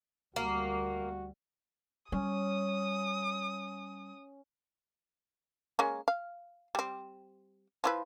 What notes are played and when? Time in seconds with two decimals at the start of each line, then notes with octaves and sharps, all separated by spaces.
0.36 D2 G3 A#3 F#4
2.12 G3 C#4 D#6
5.79 G#3 A#3 C#4
6.08 F5
6.75 G3 C4
7.84 F3 E4 B4